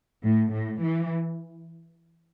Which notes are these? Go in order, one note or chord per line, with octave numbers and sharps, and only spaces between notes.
A2
A2
E3